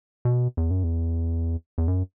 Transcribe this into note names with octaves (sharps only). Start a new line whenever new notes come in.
B2
E2
F#2
E2
E2
F#2